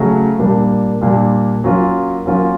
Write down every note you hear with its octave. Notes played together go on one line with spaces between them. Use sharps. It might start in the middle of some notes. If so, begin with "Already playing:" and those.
Already playing: C#3 F#3 A3 C#4
A#2 G3 A#3 D4
A#2 G3 A#3 D4
F#3 A#3 C#4 F4
F#3 A#3 C#4 F4